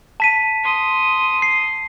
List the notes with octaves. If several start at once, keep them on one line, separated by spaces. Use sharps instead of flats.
A5 B6 D#7
C6 D#6
C7